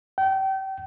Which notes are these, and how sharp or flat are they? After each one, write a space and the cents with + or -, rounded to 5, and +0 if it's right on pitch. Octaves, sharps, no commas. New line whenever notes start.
G5 -30